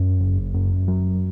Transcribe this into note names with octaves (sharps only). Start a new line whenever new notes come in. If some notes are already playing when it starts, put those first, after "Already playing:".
Already playing: F#2
F#1
F#2
F#3